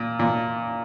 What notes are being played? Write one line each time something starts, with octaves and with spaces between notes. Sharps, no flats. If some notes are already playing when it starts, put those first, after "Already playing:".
Already playing: A#2
A#2